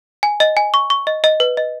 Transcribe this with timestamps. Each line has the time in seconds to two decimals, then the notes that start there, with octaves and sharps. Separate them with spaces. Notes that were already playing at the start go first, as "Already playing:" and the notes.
0.23 G#5
0.40 D#5
0.57 G#5
0.74 C#6
0.90 C#6
1.07 D#5
1.24 D#5
1.40 B4
1.57 D#5